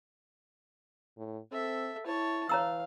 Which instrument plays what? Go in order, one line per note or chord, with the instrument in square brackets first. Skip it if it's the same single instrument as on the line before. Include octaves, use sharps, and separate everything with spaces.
[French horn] A2
[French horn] C4 [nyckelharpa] A4 E5
[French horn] E4 [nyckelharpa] C#5 A5
[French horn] E3 [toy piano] C#5 A#5 E6 [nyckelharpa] F5